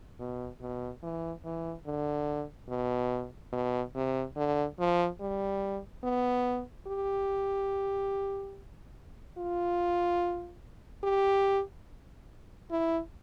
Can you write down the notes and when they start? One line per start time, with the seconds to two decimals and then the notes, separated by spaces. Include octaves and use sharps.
0.20 B2
0.61 B2
1.03 E3
1.45 E3
1.86 D3
2.69 B2
3.53 B2
3.95 C3
4.36 D3
4.79 F3
5.21 G3
6.04 B3
6.87 G4
9.38 F4
11.04 G4
12.71 E4